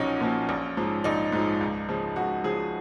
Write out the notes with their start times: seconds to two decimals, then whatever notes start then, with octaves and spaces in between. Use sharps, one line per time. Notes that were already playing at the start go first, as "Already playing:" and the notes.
Already playing: B1 A#2 F3 C#4 D#4 F#4
0.21 A#2 F3
0.49 A#1
0.77 G#2 F3
1.04 A#1 D#4
1.32 G#2 F3
1.61 C#2
1.89 C#3 F3
2.16 C#2 F#4
2.44 C#3 F3 G#4